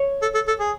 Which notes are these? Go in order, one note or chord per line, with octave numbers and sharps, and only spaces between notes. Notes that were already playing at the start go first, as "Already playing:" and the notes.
Already playing: C#5
A4
A4
A4
G#4